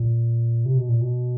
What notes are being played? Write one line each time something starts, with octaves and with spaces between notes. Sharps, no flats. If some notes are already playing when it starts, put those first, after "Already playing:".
Already playing: A#2
C3
B2
A#2
B2